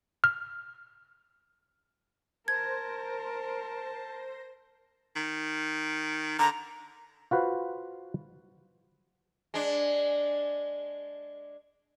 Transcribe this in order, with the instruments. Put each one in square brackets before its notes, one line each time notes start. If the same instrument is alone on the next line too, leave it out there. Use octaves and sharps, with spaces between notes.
[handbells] F6
[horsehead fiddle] A#4 [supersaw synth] C5 A#6 [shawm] A5 [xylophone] G#6
[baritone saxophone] D#3
[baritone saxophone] D3 [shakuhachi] A#5
[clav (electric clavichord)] F4 F#4 B4 C5 F5
[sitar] G#3 D4